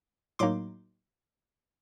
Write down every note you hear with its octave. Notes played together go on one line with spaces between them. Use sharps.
A2 F#3 A#3 D#4 C6 D6